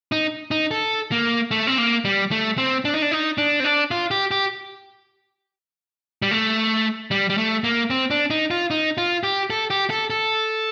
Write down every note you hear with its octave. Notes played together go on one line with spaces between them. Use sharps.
D#4
D#4
A4
A#3
A3
C4
A#3
G3
A3
C4
D4
D#4
D4
D#4
D4
C4
D4
F4
G4
G4
G3
A3
G3
G3
A3
A#3
C4
D4
D#4
F4
D#4
F4
G4
A4
G4
A4
A4